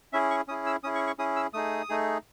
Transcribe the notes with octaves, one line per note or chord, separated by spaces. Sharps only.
C#4 E4 G#4 E5
C#6
C#4 E4 G#4 D#6
E6
C#4 E4 G#4 D#6
C#6
C#6
C#4 E4 G#4 D#6
E6
A3 D#4 G#4 D#6
A3 D#4 G#4